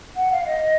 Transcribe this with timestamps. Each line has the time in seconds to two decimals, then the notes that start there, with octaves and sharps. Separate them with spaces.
0.16 F#5
0.32 F5
0.46 D#5